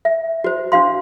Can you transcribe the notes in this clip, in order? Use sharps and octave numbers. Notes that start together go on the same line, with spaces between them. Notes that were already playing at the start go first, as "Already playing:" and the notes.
E5
F#4 C5
D4 F#4 F5 C6